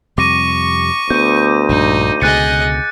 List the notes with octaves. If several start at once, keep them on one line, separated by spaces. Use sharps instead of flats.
F2 C3 G3 C#6 D6 A#6 D#7
D2 B3 G6 D#7
A#1 G2 D#4
C#2 B2 D3 G#4 D#5 F#6 A6 C#7